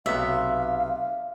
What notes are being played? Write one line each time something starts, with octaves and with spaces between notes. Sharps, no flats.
B1 C3 B3 E5 F5